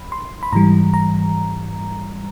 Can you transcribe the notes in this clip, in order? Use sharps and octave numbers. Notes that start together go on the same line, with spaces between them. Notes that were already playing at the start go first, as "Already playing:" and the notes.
Already playing: B5
C6
B5
G#2 E3 G3 A#5
A#5